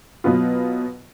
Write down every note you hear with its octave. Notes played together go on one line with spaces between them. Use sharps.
B2 F#3 B3 F4